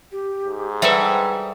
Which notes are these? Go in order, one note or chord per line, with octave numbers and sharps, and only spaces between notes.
G4
G#2
G3 A4 B4 C5 E5 F#5